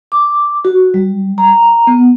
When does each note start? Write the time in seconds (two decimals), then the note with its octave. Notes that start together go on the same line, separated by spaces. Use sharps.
0.12 D6
0.65 F#4
0.94 G3
1.38 A#5
1.87 B3